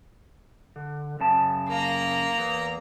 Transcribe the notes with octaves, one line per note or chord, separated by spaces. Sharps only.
D3
F#2 C#3 A5
A#3 A#5
E2